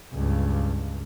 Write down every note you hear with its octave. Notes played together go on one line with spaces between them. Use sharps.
C#2 G2